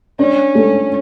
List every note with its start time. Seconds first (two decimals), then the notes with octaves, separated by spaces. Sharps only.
0.19 C#4 D4
0.55 A3